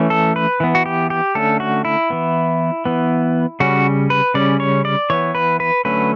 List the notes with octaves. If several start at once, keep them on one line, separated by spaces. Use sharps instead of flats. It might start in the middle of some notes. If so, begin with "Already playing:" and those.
Already playing: E3 A3 C#4
A4
B4
E3 B3
F#4
G4
G4
D3 A3 C#4 A4
F#4
E4
E3 B3
E3 B3
C#3 G3 C#4 F#4
B4
C#3 G3 C#4 D5
C#5
D5
E3 B3 C#5
B4
B4
D3 F#3 A3 C#4 B4